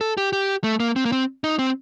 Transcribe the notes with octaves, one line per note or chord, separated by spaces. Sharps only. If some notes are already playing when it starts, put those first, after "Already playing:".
A4
G4
G4
A3
A#3
C4
A#3
C4
D#4
C4